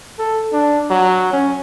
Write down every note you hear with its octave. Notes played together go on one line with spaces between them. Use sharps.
A4
D4
F#3
C#4